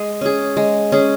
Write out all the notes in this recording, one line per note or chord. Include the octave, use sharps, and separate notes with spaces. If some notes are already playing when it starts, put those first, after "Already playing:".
Already playing: G#3 G#4
C#4 G#4
G#3
C#4 G#4